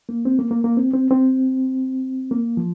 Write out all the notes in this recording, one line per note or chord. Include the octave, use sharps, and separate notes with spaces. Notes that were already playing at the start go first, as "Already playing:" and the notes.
A#3
C4
A#3
A#3
A#3
C4
C4
C4
A#3
F3